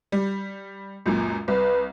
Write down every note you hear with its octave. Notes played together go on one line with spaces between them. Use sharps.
G3
C#2 F#2 A#2
C2 B4